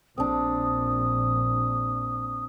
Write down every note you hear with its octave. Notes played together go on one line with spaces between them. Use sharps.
A#1 C4 D4 D#6